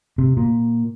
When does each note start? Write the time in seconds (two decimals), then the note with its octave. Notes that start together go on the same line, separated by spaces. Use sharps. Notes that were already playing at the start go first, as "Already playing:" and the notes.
0.18 C3
0.37 A#2